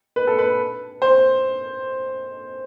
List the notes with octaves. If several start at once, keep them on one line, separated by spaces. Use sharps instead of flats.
B4
A4
B4
C5